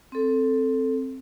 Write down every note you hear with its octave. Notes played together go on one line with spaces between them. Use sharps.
C4 A4